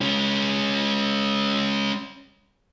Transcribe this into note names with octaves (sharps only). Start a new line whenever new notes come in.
G#3 C#4